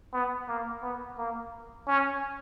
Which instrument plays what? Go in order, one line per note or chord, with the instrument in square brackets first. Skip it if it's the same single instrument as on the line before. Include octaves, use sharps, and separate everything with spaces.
[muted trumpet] B3
A#3
B3
A#3
C#4